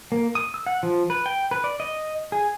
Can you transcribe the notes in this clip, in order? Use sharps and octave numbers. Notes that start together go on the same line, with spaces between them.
A#3
D#6
E6
F#5
F3
B4
G5
B4
D5
D#5
G#4